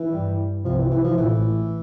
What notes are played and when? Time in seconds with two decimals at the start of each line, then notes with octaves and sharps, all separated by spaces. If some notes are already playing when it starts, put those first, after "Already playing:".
Already playing: E3
0.12 G2 G3
0.64 C2 C3 F3
0.78 E3
0.91 E3
1.04 F3
1.17 A1 A2 E3